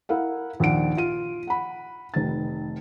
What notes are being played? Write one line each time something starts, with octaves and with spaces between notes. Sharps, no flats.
E4 A#4 F5 F#5
A#1 D#2 F#5 D7
F4 D#7
F#5 B5
F1 D#3 A6